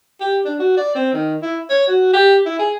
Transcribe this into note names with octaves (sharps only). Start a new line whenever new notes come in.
G4
D4
F#4
D5
C4
D#3
E4
C#5
F#4
G4
E4
G#4